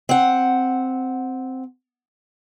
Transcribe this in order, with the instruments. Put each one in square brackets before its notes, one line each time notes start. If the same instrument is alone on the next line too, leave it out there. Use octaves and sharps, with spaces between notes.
[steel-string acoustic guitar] C4 F#5